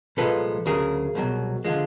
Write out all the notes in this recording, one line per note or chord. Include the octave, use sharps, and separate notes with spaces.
C2 A#2 F3 G#3 A4 B4
D2 C#3 F#3 G#4 A#4
C2 B2 F#3
D3 F3 G#3